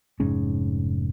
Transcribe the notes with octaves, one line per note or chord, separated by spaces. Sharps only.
F1 G#2 C#4